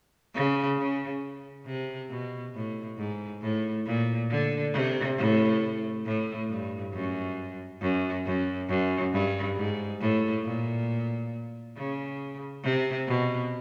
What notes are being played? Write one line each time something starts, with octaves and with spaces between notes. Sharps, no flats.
C#3
C#3
C3
B2
A2
G#2
A2
A#2
D3
C3
A2
A2
G2
F#2
F#2
F#2
F#2
G2
G#2
A2
A#2
C#3
C3
B2